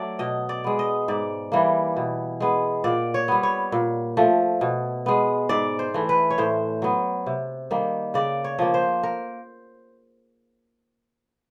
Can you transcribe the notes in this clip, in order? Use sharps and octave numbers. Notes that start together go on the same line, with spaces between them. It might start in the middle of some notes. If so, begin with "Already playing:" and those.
Already playing: F#3 A3 D5
B2 D#5
D5
G#3 B3
D#5
G#2 D5
E3 G3 A#3
B2
G#3 B3
A#2 D5
C#5
G3 B3
C#5
A#2
F3 A3
B2
G#3 B3
G#2 D5
C5
E3 A3
B4
C#5
A2 C5
F#3 B3
C3
D#3 G3 A#3
C#3 D5
C#5
F3 A#3
C5
A#4